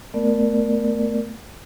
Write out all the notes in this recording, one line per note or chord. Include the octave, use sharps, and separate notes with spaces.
A3 B3 A#4 D5